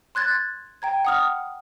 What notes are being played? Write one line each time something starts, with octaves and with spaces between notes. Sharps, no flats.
C6 F#6 G#6 A6
G5 A#5 G#6
F#5 D#6 F6